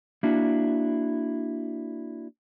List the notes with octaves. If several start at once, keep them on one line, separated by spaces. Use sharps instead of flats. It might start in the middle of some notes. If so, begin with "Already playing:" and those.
A#3 D4 E4 F#4